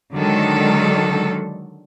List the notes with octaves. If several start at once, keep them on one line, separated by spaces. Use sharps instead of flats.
D3 D#3 F#3 G#3 A4